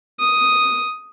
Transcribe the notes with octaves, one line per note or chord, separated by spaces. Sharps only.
D#6